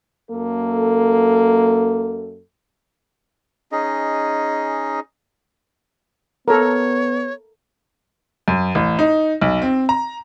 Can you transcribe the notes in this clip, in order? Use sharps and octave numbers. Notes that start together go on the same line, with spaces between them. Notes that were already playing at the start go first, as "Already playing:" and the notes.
F#2 A#3 A4
C#4 D#4 G#4 D#5
B3 A4 A#4 C#5
F#2
A1
D#4
B1
C4
A#5